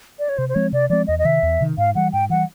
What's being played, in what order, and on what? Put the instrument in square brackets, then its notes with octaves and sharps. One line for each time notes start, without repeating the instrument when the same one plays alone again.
[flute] D5
C#5
[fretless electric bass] C3 [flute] C5
[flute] C5
[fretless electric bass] F3 G#3 C4 [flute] C#5
[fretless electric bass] C3 [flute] D5
[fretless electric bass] F3 G#3 C4 [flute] D5
[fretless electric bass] E2 [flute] D#5
[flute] D#5
[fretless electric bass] C3 D#3 [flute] E5
[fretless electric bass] E2
C3 D#3
[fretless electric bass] G#2 [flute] F5
[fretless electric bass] E3 G3 [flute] F#5
[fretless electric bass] G#2 [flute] G5
[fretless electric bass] E3 G3 [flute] F#5